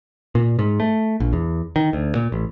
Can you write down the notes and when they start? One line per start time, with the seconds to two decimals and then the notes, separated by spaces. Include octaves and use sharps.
0.35 A#2
0.59 G#2
0.80 A3
1.20 A#1
1.33 E2
1.76 D#3
1.93 D2
2.15 A#2
2.32 A1